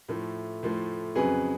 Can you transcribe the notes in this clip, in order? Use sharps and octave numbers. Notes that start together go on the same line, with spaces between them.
A2 F3 A3
A2 F3 A3
F2 C#3 F#3 G#4 B4